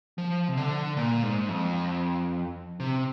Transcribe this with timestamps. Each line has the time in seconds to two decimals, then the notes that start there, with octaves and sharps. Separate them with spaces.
0.18 F3
0.48 C3
0.57 D3
0.97 A#2
1.23 G#2
1.49 F2
2.80 C3